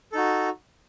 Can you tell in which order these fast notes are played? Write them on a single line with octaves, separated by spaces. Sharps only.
A4 D#4 F#4